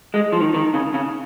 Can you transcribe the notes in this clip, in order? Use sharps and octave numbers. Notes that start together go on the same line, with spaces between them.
G#3
F3
D#3
D#3
C#3
C#3